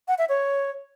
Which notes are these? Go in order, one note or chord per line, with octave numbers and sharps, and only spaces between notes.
F#5
E5
C#5